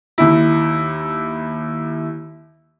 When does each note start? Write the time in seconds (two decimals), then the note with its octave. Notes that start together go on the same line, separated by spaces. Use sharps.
0.18 D#2 E4